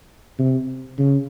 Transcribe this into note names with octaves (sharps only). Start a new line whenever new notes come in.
C3
C#3